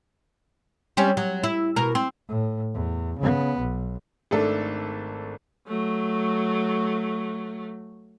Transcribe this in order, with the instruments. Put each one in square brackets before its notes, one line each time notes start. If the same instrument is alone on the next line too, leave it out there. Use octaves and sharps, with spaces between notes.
[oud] G3 C4 C#4
F#3
E4
B2 A#4
C4
[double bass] A2
E2
C#3 B3
B1
[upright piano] G#1 A3 D4 A4
[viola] F#3 A3